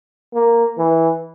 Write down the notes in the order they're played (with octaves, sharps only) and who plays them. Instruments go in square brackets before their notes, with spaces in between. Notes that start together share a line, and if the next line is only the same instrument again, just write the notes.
[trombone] A#3
E3